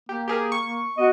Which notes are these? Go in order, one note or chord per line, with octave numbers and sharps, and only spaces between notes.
A#3 G4
G4 G#4 A#4
C#6
B3 F#4 D#5